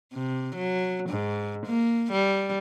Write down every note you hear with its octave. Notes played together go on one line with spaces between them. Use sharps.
C3
F#3
G#2
A#3
G3